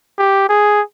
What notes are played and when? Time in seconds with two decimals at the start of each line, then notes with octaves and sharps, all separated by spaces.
0.18 G4
0.49 G#4